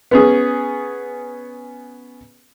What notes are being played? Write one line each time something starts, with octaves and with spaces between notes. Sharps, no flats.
B3 C#4 G#4